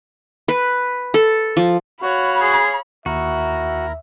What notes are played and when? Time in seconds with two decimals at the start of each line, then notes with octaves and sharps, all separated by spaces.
0.48 B4
1.14 A4
1.57 F3
2.02 F#4 C#5 F5 B5
2.42 G#4
3.06 D#2 E4 F#4 A#4 E5 A#5